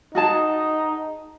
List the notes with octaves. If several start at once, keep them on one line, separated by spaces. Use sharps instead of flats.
D#4 F#4 G#4 A5